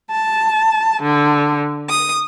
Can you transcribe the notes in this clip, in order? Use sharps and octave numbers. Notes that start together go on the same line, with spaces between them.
A5
D3
D#6